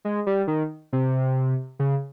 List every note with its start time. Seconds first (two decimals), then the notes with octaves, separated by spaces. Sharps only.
0.05 G#3
0.26 G3
0.47 D#3
0.93 C3
1.79 C#3